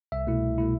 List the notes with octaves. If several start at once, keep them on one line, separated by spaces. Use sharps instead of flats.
C2 E5
B2 A3 E4
C2
B2 A3 E4